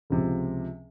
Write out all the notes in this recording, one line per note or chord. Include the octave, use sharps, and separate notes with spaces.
C#2 C3 F3